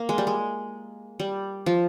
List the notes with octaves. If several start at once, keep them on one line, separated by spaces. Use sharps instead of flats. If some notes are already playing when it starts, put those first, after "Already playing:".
Already playing: A#3
G#3
G3
G#3
G3
F3